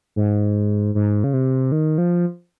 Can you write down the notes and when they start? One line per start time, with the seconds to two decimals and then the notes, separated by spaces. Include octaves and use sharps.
0.16 G#2
0.95 G#2
1.24 C#3
1.33 C3
1.72 D#3
1.98 F3